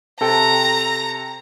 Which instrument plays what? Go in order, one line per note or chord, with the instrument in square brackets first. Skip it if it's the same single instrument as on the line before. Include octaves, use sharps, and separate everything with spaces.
[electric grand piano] C3 A4 G5 [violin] A#5